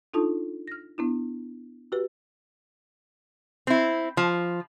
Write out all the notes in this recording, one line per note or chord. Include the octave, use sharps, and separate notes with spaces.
D4 D#4 F4 A4 A5 D#6
F6 A#6
B3 D4 E4
F#4 G4 B4
C4 E4
F3